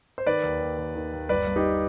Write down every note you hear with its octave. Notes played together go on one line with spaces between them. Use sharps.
C5
D#3 B4 D5
D#2
D#2
D#2
D#3
D#2
G1 B4 D5
G2
D#4 G4